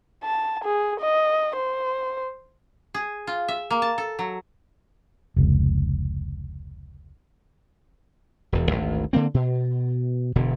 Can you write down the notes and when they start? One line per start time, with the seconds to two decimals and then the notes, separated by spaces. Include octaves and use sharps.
0.24 A5
0.64 G#4
1.00 D#5
1.57 C5
2.94 G#4
3.27 F4
3.48 E5
3.70 A#3
3.82 A5
3.98 A4
4.19 F#3
5.36 F1 C#2
8.52 E1 E2
8.71 G#1 D2
9.13 D3 A#3 C4
9.34 B2
10.36 E1 B2 D3